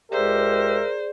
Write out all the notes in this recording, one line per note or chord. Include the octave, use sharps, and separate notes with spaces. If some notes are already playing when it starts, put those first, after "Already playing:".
C#2 G4 G#4 A#4 C5 D5 E5